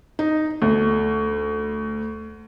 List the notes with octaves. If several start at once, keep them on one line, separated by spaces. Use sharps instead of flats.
D#4
D2